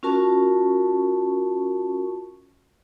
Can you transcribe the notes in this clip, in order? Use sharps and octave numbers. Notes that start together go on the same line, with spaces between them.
C#4 F4 F#4 A#4 A5 C#6